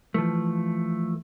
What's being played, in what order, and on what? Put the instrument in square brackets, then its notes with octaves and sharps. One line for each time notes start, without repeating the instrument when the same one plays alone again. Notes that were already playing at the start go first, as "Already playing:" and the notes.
[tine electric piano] E3 [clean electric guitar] F3 A3